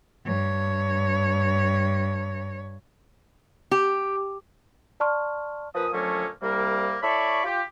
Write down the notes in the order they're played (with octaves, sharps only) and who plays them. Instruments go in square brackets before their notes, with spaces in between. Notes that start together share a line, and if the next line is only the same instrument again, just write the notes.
[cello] G2 C#5
[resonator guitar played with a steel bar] G4
[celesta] D5 A5 C6 C#6 F6
[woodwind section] A#2 F3 B4 D#6
D3 F3 F#3 A3 A#3 C#4
C2 C3 G3 A#3
E4 A4 C#5 D5 B5 C#6
F4 G4